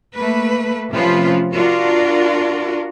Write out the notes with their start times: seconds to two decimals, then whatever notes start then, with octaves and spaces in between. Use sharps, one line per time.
0.14 A3 A#3 B4
0.90 C3 F3 A3 C#4 F4 B4
1.52 D4 F4 F#4 A#4